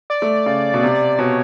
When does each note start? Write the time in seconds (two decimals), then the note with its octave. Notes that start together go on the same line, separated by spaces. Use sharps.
0.10 D5
0.22 A3
0.46 C#3
0.74 B2
0.83 C3
1.19 B2 C#5